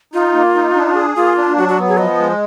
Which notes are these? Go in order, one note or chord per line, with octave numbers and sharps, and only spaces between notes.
D#4 F4
A#3
D#4
D4
G#4
A#3 F4
D4
F#3 F#4
F#4
B3
G#4
F3 D#5
G#3